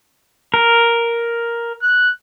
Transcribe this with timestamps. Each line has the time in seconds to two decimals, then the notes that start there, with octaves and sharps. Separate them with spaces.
0.54 A#4
1.82 F#6